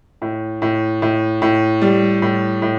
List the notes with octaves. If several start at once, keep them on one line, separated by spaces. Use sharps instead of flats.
A2
A2
A2
A2
G3
A2
A2